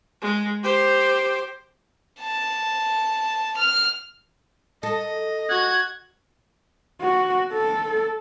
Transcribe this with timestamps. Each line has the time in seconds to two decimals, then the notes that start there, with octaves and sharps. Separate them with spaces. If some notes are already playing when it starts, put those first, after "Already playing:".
0.22 G#3
0.64 G4 C5
2.21 A5
3.57 F6
4.83 A4 D#5
5.49 F#4 F#5 G#6
7.01 F#4
7.53 A4